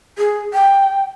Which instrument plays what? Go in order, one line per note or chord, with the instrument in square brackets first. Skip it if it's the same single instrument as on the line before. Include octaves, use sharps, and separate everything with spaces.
[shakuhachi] G#4
G5